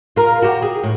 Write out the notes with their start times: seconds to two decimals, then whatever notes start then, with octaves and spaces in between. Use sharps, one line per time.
0.16 F4 A#4
0.42 F#4 G4
0.62 G#4
0.83 A2